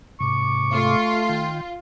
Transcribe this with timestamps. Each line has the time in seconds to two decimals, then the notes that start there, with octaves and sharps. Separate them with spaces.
0.20 G#2 C3 C#6 D6
0.72 A3 F4
1.29 D#3 G5